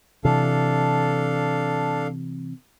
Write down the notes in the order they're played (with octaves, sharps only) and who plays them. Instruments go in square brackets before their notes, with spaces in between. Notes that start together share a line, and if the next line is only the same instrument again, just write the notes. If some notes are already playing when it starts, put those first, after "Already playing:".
[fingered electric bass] C3 E3 [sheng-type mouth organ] D4 A4 F5